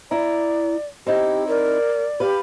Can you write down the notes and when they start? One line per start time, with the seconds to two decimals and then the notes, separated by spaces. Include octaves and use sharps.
0.11 E4 D5 A#5
1.07 C4 D#4 E4 G4
1.48 A#4 D5
2.20 G4 B4 F5